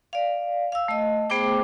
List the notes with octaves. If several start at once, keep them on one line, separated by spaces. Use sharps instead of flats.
D5 F5
F5 E6
A3 D#5
A3 B3 G#4 C5 G5 D6